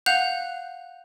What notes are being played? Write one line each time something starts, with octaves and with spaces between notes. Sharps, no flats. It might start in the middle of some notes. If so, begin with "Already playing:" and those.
F5 F#5 F#6 G6 F7